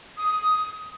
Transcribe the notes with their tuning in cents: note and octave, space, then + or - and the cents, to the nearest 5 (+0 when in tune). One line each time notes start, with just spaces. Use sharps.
D#6 +10